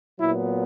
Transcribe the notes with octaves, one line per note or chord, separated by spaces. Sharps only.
A#2 F#3 B3 E4